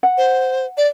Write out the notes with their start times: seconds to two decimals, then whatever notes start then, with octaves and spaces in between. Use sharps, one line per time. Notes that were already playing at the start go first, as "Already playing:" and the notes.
0.03 F#5
0.18 C5
0.77 D5